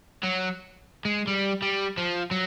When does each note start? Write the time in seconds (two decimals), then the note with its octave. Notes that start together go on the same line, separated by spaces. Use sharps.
0.24 F#3
1.05 G#3
1.27 G3
1.62 G3
1.98 F3
2.31 F#3